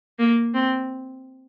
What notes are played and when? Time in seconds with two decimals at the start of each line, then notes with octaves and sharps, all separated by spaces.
0.19 A#3
0.55 C4